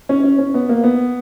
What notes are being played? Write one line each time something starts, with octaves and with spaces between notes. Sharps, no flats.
C#4
C#4
C#4
B3
A#3
B3